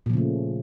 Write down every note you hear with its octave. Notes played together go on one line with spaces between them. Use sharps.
A#2 C#3 F3 A3